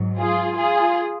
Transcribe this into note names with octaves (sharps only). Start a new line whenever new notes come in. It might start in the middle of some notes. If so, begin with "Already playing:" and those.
Already playing: G#2 F#3
F4 G#4
F4 G#4